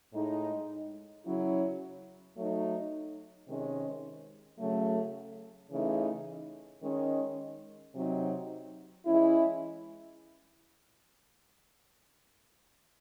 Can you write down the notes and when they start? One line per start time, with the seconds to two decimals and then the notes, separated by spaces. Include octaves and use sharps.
0.13 A2 G#3 D#4
1.25 C#3 F#3 C#4 E4
2.36 F#3 A3 D#4
3.48 C3 D#3 G#3 C#4
4.59 C#3 F#3 A3
5.71 C#3 E3 A3 D#4
6.82 D#3 G#3 C#4
7.95 C3 F#3 C4 D#4
9.05 E3 G#3 C#4 E4